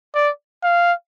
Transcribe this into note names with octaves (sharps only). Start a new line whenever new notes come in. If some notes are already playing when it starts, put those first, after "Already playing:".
D5
F5